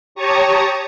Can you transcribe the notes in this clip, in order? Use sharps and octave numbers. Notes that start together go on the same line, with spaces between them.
G4 C#5 A5 A#5 C#6 D#6